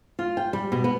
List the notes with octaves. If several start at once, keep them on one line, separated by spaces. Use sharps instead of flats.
F4
G5
G3
B2
B3